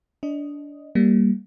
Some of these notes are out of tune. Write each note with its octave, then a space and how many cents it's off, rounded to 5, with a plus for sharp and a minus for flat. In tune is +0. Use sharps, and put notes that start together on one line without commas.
D4 -20 D#5 +0
G3 +0 A#3 +0